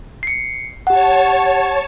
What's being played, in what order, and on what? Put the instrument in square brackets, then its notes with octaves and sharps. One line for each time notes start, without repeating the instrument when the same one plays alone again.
[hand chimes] C7 C#7
[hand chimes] G4 F#5 [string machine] C#5 A5